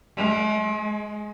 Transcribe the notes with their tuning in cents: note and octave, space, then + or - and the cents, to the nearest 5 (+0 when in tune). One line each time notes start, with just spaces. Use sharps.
G#3 +45
G#3 +15